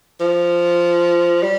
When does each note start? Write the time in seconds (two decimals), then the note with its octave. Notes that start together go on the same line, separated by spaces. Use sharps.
0.21 F3
1.43 G3